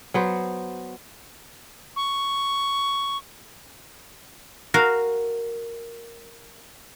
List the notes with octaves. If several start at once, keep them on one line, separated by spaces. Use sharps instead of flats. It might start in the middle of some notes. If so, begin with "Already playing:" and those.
F#3 B3 C5
C#6
F#4 A#4 F5